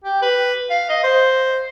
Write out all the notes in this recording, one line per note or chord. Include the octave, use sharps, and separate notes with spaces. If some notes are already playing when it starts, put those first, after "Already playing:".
G4
B4
F5
D#5
C5